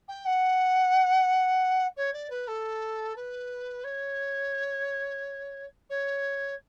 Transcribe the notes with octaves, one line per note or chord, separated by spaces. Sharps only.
G5
F#5
C#5
D5
B4
A4
B4
C#5
C#5